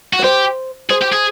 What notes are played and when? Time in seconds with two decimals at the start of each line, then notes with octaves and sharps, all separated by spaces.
0.13 F#4
0.19 C#5
0.24 G4 C5
0.90 G#4 C5
1.01 G4
1.12 G#4